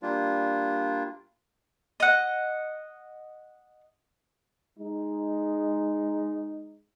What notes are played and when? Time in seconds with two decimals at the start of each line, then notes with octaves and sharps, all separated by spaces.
0.02 G3 A#3 D4 F4
2.00 D#5 F#5
4.79 G#3 D#4